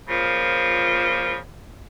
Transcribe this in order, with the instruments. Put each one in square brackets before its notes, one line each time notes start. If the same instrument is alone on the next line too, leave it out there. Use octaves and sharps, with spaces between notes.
[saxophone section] A#2 C#3 F3